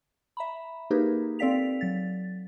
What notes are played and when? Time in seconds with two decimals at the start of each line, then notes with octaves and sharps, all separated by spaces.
0.37 E5 A#5 B5
0.90 A#3 D#4 G4 G#4 A#4 B4
1.39 C4 A4 D5 F5 B6 F7
1.81 F#3 A6